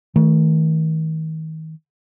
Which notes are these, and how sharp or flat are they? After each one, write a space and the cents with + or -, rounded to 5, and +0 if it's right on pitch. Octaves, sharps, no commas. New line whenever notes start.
D#3 +35 A3 +0